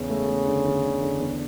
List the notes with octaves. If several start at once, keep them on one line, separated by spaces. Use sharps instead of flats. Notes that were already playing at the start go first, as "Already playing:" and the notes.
Already playing: E2 C#3
A3
A3
D3
D3
D3
D3
E2